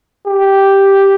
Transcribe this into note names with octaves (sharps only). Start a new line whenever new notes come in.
G4